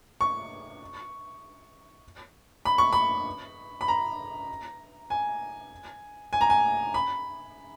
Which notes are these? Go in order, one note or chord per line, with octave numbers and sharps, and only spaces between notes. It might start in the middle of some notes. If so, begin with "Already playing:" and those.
C#6
B5
C#6
B5
B5
A#5
G#5
G#5
A#5
G#5
B5